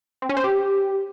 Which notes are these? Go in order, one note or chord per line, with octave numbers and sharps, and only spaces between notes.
C4
C#4
C5
G4